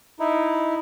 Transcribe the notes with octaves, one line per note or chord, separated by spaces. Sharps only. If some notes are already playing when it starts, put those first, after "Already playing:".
D#4 E4